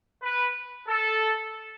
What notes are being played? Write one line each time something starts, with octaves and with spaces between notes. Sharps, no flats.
B4
A4